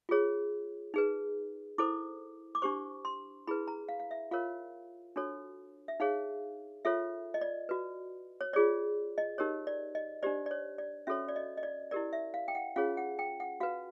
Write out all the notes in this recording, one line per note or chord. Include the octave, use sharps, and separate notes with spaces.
F4 G#4 C#5
D#4 G#4 B4
E4 A4 C5 D6
D6
D4 G4 C5 C#6
C6
E4 G#4 B4 B5
A#5
F5
F5
E5
F4 A#4 C#5 F5
D4 F#4 A4 C#5
E5
D#4 G#4 C#5 F5
F4 A4 C#5 E5
D#5
D5
F#4 B4
C#5
F4 G#4 C#5 D5
D#5
D#4 G4 A#4 C#5
D5
D#5
D4 G4 C5 D5
D5
C#5
D5
C#4 F#4 A4 C#5 E5
D5
D#5
D#5
D5
E4 G4 A#4 D5
E5
F5
G5
F#5
C#4 F4 G#4 C#5 F5
F#5
G5
F#5
F#4 B4 F5